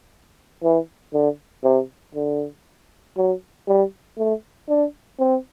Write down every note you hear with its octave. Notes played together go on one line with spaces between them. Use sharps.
E3
D3
C3
D3
F#3
G3
A3
D4
C4